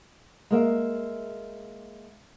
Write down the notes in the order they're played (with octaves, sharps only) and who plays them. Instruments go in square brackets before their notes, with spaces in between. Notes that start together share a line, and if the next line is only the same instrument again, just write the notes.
[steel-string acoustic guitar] G#3 A#3 E5